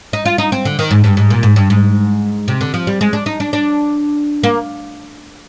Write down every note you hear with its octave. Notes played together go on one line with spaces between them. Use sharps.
D#4
F4
D#4
C4
D3
D#3
G#2
G2
G#2
A#2
G#2
G2
G#2
C3
D3
F3
G3
G#3
D4
D#4
D4
D4
A#3